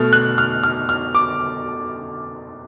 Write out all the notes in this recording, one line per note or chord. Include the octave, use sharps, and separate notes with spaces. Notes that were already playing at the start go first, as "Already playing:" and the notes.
Already playing: B2 A3 F6
F#6
F6
F6
F6
D6